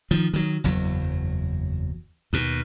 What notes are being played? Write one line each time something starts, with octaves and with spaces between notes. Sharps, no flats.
D#3 F3
D#3 F#3
F#1 E2 F#3
D#2 B2